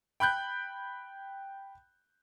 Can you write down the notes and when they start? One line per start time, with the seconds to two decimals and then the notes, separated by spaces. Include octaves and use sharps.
0.20 G5 B5 F#6 G6